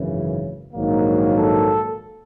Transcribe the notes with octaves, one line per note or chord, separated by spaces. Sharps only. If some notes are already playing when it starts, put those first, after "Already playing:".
Already playing: G#1 F#2 C#3 E3
A#1 G#2 D#3 F#3 A#3
A4